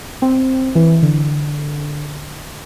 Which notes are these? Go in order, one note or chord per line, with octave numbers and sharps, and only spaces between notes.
C4
E3
D3